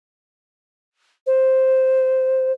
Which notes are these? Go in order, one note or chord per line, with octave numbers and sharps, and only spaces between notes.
C5